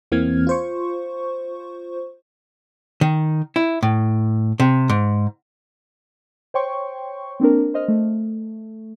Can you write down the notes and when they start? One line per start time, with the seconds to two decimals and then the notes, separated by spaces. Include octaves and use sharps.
0.12 E2 E3 A#3 C4 F6 G#6
0.47 F4 C5 C#6
3.01 D#3
3.56 E4
3.83 A2
4.60 C3
4.89 G#2
6.54 C5 C#5 G5 C6 C#6
7.40 A#3 C4 D4 A#4
7.74 C5 D#5 F6
7.88 A3